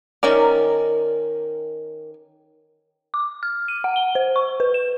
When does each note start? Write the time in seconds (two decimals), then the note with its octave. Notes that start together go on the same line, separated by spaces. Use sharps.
0.23 D#3 C#4 A#4 D5
3.14 D6
3.43 F6
3.68 D#7
3.84 F#5
3.96 G7
4.15 C5
4.36 C#6
4.60 B4
4.74 E7